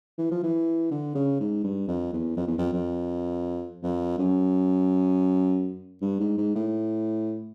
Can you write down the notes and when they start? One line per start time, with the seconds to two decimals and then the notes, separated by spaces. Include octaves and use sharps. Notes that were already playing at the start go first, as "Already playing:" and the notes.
0.18 E3
0.31 F3
0.43 E3
0.91 D3
1.15 C#3
1.40 G#2
1.64 G2
1.88 F2
2.13 E2
2.37 F2
2.47 E2
2.58 F2
2.73 F2
3.83 F2
4.19 F#2
6.02 G2
6.20 G#2
6.38 G#2
6.56 A2